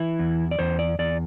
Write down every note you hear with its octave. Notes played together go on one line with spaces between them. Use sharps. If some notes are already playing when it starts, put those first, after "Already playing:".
Already playing: E3 E4
E2
D5
E2 C5
D5
E2 D5